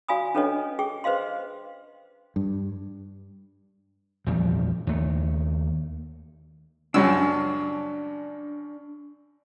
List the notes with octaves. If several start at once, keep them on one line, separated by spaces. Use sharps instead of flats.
F#4 D5 F5 G#5 B5 D#6
C#4 D4 A4 B4 C#5 D#5
G#4 G5 C#6
B4 C5 D#5 F5 C6
G2
A#1 E2 F3 G3
D#2 A3
C#2 F#2 G3 C#4 D4 A5 E6